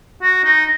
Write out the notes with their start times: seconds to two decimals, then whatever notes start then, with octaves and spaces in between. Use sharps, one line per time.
0.22 F#4
0.45 D#4